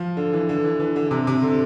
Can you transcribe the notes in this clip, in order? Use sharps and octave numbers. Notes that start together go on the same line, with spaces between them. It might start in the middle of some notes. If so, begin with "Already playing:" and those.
Already playing: F3
D3
E3
D3
E3
E3
D3
D3
C3
C3
D3